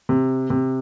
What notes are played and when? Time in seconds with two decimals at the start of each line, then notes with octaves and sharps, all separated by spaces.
0.09 C3
0.50 C3